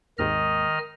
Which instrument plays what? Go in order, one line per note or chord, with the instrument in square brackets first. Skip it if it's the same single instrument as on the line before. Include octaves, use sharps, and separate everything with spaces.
[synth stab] G#1 D#2 G#2 [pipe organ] D#3 D#5 F6